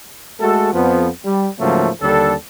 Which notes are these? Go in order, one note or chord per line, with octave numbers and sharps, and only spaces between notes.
G#3 A3 F#4 A4
F2 F3 B3
G3
G#2 C#3 F3 F#3 A3 A#3
D#2 D3 G3 D4 A4